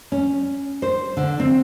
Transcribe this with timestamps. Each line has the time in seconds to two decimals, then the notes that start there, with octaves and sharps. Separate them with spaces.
0.12 C#4
0.82 C5
1.17 D3
1.40 C4